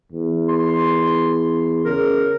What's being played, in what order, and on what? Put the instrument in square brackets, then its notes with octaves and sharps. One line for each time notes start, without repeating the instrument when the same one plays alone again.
[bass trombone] E2
[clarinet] C6
[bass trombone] C#3 [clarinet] A#4